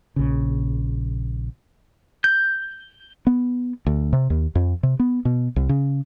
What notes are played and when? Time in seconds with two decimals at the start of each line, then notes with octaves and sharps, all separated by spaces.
0.16 A#1 C#3
2.24 G6
3.27 B3
3.86 D2
4.13 C3
4.30 D#2
4.55 F2
4.83 C3
5.00 B3
5.25 B2
5.56 C2
5.69 C#3